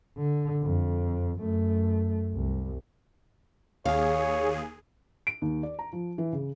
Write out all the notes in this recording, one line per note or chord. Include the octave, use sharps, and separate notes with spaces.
D3
F2
F#2 A3
C2
D#2 G#4 C#5 F5
D7
D#2
D5
A#5
F3
E3
C#3